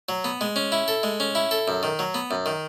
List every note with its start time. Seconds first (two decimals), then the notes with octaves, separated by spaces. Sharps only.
0.09 F#3
0.24 B3
0.41 G#3
0.56 C#4
0.72 E4
0.88 A4
1.03 G#3
1.20 C#4
1.35 E4
1.51 A4
1.68 F#2
1.83 D#3
1.99 F#3
2.14 B3
2.31 F#2
2.46 D#3